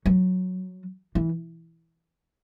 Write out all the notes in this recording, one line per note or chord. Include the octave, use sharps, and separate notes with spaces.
F#3
E3